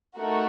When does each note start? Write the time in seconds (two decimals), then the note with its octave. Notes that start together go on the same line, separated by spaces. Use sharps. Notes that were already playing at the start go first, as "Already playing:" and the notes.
0.17 A3 D#4 F#4 A#4